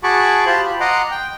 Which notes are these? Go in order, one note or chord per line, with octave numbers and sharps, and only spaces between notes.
F#4 G#4 A5 B5 C#6 D6
F4 G4 C5 A5 B5
B5
D#5 F#5 A#5 C6 D6
G5